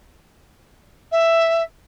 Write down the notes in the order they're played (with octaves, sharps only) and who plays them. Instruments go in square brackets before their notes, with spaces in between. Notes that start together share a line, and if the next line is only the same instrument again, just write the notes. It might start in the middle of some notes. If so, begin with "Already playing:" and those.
[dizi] E5